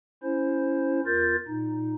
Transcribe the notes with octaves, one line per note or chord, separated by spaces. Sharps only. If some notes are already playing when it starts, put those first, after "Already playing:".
C#4 E4 C5
E2 F4 A#4 G6 A6
A#2 D#4